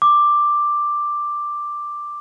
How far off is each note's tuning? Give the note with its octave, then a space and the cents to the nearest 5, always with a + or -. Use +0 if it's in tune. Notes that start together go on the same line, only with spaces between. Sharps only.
D6 +5